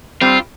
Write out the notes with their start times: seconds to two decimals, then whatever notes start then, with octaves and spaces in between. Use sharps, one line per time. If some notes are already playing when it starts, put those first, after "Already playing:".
0.21 G3 C4 F4